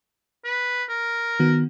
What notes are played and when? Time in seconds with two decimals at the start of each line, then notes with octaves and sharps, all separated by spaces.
0.44 B4
0.89 A#4
1.40 D#3 B3 F#4